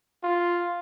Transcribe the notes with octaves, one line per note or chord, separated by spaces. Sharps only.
F4